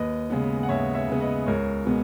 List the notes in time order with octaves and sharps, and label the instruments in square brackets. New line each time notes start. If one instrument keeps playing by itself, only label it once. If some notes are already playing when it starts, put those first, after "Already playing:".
Already playing: [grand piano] D#2 B4 D#5
C#3 G#3 B3
F#5
D#2 C#5 E5
C#5 E5
C#3 G#3 B3
B4 D#5
C#2 A#4 C#5
B2 G#3 B3